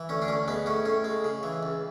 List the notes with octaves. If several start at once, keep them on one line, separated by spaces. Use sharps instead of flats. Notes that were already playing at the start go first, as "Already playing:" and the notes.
Already playing: E3
D2 C#4
D4
D2 C#4
G#3 B3
A2 C#4
A2 C#4
G#3
C#3
E3
C#2